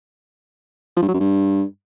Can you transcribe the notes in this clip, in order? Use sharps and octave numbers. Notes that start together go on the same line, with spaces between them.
F3
G2
F#3
F#2
G2